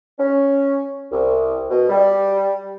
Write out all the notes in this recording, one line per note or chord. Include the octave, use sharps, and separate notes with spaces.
C#4
C2
B2
G3